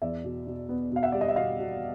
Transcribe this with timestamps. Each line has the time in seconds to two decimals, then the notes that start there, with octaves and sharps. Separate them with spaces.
0.02 E2 D5 E5
0.24 B2
0.47 B2
0.69 B3
0.92 B2 F5
1.03 E5 F#5
1.12 G3 D5
1.21 D#5
1.28 E5
1.36 B2 D#5 F5
1.59 B2